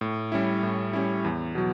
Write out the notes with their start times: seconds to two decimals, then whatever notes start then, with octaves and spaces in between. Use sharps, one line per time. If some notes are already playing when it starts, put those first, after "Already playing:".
0.01 A2
0.32 G3 C#4 E4
0.63 A2
0.93 G3 C#4 E4
1.25 E2
1.55 B2 F#3